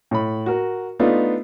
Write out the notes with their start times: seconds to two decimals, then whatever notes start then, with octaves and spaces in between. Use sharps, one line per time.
0.11 A2 B5
0.46 F#4 A#4
0.99 A3 B3 D4 D#4 F4